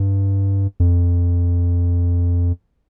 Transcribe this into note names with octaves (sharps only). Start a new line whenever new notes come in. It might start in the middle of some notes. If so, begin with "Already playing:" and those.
Already playing: G2
F2